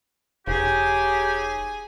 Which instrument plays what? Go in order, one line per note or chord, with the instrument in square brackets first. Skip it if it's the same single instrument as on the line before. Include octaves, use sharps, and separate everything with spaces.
[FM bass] E1 [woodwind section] C#3 D#4 G4 [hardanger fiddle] G#4 G#5